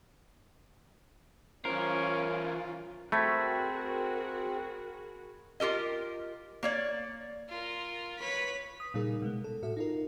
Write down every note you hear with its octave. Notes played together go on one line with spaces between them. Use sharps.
E3 C#4 F4 A#4 C5
A3 C4 F#4 G#4 A#4 B5 G#6 B6
F4 G4 A#4 D#5
A#3 C#5 D5
F4 A#4
B4 C#5 B6
D#6
A#2 C#3 G3 D#4 G#4 A#4
B2 G#3 B3
A4
A2 F#4 A4 E5
D#4 F4 A#4